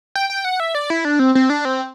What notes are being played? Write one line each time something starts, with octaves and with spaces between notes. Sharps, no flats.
G5
G5
F#5
E5
D5
E4
D4
C4
C4
D4
C4